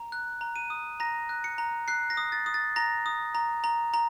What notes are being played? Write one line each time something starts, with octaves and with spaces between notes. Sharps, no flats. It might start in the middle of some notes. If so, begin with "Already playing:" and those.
Already playing: A#5
F#6
A#5
D#7
D#6
A#5 A#6
F#6
C#7
A#5
F#6 C7
A#6
D#6
A6
D#6
A6
A#5 A#6
D#6
A#5
A#5
A#5